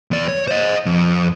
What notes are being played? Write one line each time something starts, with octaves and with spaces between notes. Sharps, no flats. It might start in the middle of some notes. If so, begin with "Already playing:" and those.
E2 D5
C#5
C5 D#5
F2